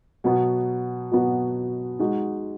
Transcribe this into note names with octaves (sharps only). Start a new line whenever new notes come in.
B2 F#3 B3 F#4
B2 F#3 B3 F#4
G#3 D#4 F#4